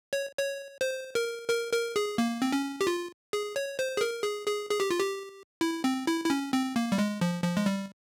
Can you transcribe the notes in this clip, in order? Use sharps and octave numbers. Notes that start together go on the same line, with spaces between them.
C#5
C#5
C5
A#4
A#4
A#4
G#4
A#3
C4
C#4
G4
F4
G#4
C#5
C5
G#4
A#4
G#4
G#4
G#4
G4
F4
G4
E4
C4
E4
E4
C#4
C4
A#3
G3
G#3
F3
F3
G#3
G3